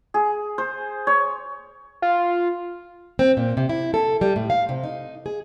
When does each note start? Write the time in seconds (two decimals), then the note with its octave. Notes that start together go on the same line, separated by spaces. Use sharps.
0.14 G#4
0.58 C5
1.07 C#5
2.02 F4
3.19 C4
3.37 A#2
3.57 C3
3.69 E4
3.94 A4
4.21 G3
4.36 A2
4.50 F5
4.69 C3
4.83 D#4
5.26 G#4